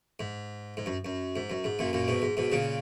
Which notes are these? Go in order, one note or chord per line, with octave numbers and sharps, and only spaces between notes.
G#2
G#2
F#2
F#2
G#2
F#2
G#2
F#2 A#2
F#2 A#2
G#2 B2
G#2
G#2 B2
A#2 C#3